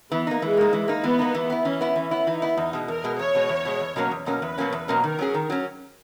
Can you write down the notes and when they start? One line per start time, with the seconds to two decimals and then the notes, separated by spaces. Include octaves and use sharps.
0.11 E3 B3
0.27 A#3 D#4
0.42 E3 G#3
0.57 A#3 D#4
0.73 E3
0.88 A#3 D#4
1.04 E3 B3
1.19 A#3 D#4
1.35 E3
1.50 B3 E4
1.65 E3 C#4
1.81 B3 E4
1.96 E3 C#4
2.11 B3 E4
2.27 E3 D#4
2.42 B3 E4
2.57 E2 D#4
2.73 B2 G#3
2.88 E2 A#4
3.04 B2 G#3
3.18 E2 C#5
3.35 B2 G#3
3.49 E2
3.65 B2 G#3
3.80 E2
3.96 B2 F#3 A#3 C#4
4.11 E2
4.26 B2 F#3 A#3 C#4
4.42 E2 B4
4.58 B2 F#3 A#3 C#4
4.72 E2
4.88 B2 F#3 A#3 C#4
5.04 D#3 A#4
5.19 F#3 C#4 G#4
5.34 D#3
5.50 F#3 C#4